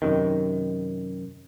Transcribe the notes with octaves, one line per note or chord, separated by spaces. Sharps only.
F#2 C3 D#3